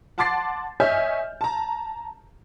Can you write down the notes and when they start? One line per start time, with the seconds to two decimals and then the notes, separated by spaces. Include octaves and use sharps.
0.18 F#5 A5 C6 D6 A6 C7
0.80 C#5 D#5 E5 G#5 F6 G6
1.41 A5 A#5